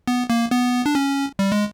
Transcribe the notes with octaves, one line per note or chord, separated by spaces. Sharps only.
B3
A#3
B3
D4
C#4
G3
G#3